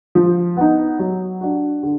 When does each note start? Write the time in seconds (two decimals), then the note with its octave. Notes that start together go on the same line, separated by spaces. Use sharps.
0.15 F3
0.57 B3 D#4
0.99 F#3
1.41 D4 F#4
1.83 D3